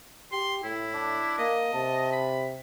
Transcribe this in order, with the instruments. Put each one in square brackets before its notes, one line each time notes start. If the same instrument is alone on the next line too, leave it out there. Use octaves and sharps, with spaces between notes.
[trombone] G4 [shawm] C6
[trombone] A2 [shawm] E4
[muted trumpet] D4
[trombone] A#3 [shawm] D#5
[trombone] C3 [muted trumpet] A5
[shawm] B5